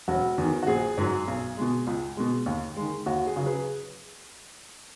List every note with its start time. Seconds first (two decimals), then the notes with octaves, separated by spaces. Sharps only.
0.08 E1 F#4
0.38 E2 D#3
0.63 F#4
0.67 A#1 G#4
0.98 G#2 F#3
1.27 B1
1.57 B2 G#3
1.87 C#2
2.17 B2 G#3
2.46 D#2
2.77 D#3 G#3
3.06 D#2 F#4
3.26 G#4
3.36 C#3 F#3
3.46 G#4 B4